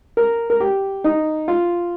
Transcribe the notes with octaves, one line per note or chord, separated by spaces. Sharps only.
A#4
A#4
G4
D#4
F4